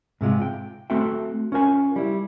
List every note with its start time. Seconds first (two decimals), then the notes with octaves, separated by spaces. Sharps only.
0.21 G#2 C3 G#3 F4
0.42 G5
0.90 A3 C4 F#4 A4 E5 G5
1.52 C#4 F4 A#4 G#5
1.96 G3 E4